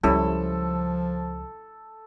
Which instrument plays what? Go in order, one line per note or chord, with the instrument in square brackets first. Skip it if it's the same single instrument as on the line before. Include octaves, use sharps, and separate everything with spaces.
[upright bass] C#2 [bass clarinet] F3 [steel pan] G3 C#4 E4 [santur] A4